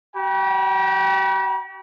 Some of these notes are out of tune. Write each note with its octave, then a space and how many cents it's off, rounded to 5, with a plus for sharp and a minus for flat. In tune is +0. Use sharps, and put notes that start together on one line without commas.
F#4 +45 G5 +0 B5 -45